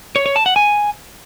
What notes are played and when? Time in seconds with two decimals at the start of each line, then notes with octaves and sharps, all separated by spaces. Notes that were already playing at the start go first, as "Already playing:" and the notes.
0.16 C#5
0.26 C#5
0.36 A5
0.46 F#5
0.56 G#5